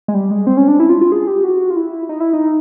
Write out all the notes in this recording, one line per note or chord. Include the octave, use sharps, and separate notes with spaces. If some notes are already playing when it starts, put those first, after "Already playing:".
G#3
G3
G#3
C4
C#4
D4
E4
F4
F4
G#4
G4
F#4
F4
E4
D#4
E4
D#4